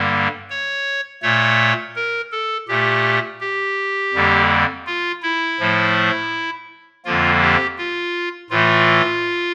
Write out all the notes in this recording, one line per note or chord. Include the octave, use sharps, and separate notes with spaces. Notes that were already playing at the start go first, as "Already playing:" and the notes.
Already playing: G2 D3 G3 A#3
C#5
A#2 A3 C#5
A#4
A4
A#2 A3 G4
G4
F2 D3 G3 A#3
F4
E4
A2 F3 A3
F2 D3 F3 A#3 F4
G4
F4
A2 E3 A3 F4